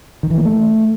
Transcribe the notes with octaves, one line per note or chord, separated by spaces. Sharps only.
D#3
E3
A#3
A3